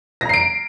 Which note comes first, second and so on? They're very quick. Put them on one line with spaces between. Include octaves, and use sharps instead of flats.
A#6 A#5 C7 D7